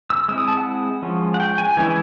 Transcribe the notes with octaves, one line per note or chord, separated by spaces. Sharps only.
E6
G#3 C4 E4 E6
D#6
A5
F#5
F3 G#3 C#4
F#5
G5
G#5
E3 G#3 C#4 E4 G#5